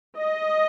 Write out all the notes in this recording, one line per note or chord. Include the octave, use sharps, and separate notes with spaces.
D#5